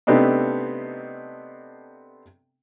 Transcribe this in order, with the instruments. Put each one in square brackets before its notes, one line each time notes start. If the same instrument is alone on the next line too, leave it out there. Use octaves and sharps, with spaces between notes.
[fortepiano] C3 A3 B3 C4 D4 D#4